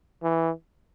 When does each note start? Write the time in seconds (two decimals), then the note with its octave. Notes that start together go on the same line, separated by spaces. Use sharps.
0.23 E3